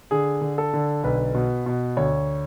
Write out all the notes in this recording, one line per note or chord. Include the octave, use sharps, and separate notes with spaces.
D3 G#4
D3
A4
D3
B1 B4
B2
B2
D2 C#5